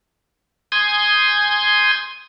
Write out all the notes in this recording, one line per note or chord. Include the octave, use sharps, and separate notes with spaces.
G#5 C6 D#6 G6 G#6